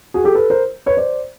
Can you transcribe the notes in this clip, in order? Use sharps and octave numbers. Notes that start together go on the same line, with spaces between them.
F#4 G#4
G4 A4
A4 B4
A#4 C5
B4 C#5
C5 D5